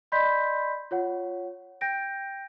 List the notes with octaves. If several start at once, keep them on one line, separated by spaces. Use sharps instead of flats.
D5 D#5 B5 C6 G6 B6
F4 C#5 F#5
G5 G6 A#6 D7